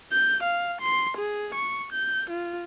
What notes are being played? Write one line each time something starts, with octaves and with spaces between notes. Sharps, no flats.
G6
F5
C6
G#4
C#6
G6
F4